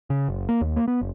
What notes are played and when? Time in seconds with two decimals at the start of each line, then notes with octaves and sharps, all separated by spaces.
0.10 C#3
0.28 F#1
0.49 A#3
0.61 D#2
0.76 A#3
0.88 B3
1.01 F#1